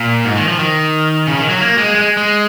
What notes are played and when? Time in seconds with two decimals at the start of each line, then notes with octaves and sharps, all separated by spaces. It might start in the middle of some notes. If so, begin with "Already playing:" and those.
Already playing: A#2
0.25 G#2
0.37 D#3
0.48 F3
0.59 D#3
1.27 C#3
1.39 D#3
1.49 F#3
1.61 A#3
1.78 G#3
1.95 G#3
2.17 G#3